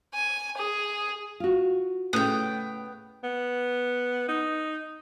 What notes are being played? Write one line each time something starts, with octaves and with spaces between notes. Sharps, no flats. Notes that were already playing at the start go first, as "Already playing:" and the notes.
G#5
G#4
F4 F#4
A2 C#3 B3 G5
B3
D#4